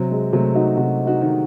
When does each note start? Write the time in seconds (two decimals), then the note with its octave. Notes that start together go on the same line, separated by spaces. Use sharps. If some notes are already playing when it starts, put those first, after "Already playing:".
Already playing: C3 F#3
0.11 G#3
0.33 C3 F#3 A3
0.55 D#4 F#4
0.77 C3 D#4 F#4
1.07 D#4 F#4
1.21 D#3